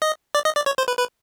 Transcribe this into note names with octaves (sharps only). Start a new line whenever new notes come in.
D#5
D5
D#5
D5
C#5
C5
B4
B4